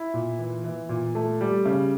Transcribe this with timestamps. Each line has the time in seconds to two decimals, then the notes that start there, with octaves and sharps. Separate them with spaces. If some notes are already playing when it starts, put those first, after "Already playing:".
Already playing: E4
0.14 A#2
0.39 E3
0.64 E3
0.89 A#2
1.15 A3
1.41 G3
1.66 C#3